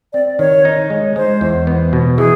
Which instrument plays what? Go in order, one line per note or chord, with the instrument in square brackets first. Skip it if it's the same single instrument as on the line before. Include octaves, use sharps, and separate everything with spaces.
[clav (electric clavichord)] C4 [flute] D5
[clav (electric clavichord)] D#3 [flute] C#5
[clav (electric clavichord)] D#4
G#3
[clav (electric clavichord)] G#3 [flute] C5
[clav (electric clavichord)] E2
B3
B2
[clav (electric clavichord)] E3 [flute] G#4